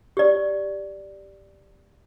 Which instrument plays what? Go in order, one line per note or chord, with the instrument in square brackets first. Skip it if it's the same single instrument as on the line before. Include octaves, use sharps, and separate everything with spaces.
[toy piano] G4 D5